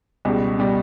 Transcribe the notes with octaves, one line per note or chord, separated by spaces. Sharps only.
C#2 B2 G3
B2 G3